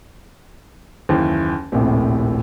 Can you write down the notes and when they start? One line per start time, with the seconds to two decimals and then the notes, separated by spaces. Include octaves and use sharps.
1.09 F#1 D#2 E3
1.72 D#1 A#1 A2 C3